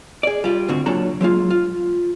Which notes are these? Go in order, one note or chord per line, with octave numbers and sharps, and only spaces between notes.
G#4 D5
G3 F4
D2 G#2 D3 C4 F#4
C#2 A#2 F#3 D4 A4 A#5
F#3 G#3 A#3 F4
F4